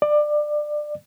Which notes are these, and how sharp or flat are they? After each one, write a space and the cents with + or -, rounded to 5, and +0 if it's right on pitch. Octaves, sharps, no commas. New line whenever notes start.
D5 +20